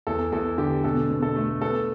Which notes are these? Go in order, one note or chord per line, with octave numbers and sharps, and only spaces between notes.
E2 A4
E2 A4
D3 G4
B2 A4
B2
A4
A3
B3 A4